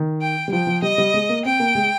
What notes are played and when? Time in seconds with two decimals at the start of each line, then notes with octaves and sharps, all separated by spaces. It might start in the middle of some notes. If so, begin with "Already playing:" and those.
Already playing: D#3
0.21 G5
0.48 G3
0.52 F3 G5
0.67 F3
0.82 G3 D#5
0.98 G3
1.14 G#3
1.29 A#3
1.45 C4 G5
1.60 A#3
1.75 G#3